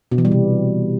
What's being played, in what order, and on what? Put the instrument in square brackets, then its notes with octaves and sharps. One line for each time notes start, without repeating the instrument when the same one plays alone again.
[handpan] B2
E3
G3
C3